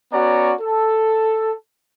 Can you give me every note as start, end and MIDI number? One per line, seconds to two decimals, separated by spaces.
0.13 0.53 59
0.13 0.53 61
0.13 0.53 66
0.13 0.53 73
0.13 0.53 74
0.13 0.53 82
0.61 1.53 69